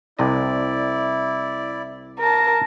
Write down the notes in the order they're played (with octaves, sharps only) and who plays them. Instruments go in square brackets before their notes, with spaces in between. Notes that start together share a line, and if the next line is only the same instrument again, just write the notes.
[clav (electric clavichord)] C2 C3 D#5 [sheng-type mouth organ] E4 D5
[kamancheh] A#4 A5 [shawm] A#5